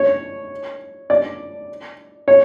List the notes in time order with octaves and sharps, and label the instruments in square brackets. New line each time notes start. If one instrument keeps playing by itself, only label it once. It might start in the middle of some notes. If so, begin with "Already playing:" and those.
Already playing: [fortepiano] C#5
D5
C#5